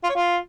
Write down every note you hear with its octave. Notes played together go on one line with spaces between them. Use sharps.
F4
C#5
F4